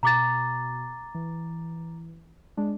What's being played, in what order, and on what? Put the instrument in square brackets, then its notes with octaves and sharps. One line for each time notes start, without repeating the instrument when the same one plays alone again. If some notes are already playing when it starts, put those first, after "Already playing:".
[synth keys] B2 [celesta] A#5 D6 A6
[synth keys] E3
G#3 D4